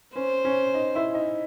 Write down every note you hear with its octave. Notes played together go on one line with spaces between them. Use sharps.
C#4 C5
C#4
D#4
E4
D#4